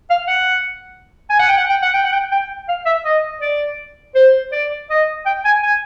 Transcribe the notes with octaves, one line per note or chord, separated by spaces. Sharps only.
F5
F#5
G#5
F#5
G5
F#5
G5
F#5
G5
F#5
G5
G5
F5
E5
D#5
D5
C5
D5
D#5
G5
G#5
G#5